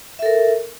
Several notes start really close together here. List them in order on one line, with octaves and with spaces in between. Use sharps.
E5 A4 A#4